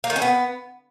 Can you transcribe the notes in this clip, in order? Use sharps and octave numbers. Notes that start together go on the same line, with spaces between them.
A#3
D#3
C#4
B3